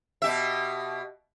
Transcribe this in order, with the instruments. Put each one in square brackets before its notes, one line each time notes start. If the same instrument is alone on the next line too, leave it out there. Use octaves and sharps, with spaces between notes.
[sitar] B2 G4 E5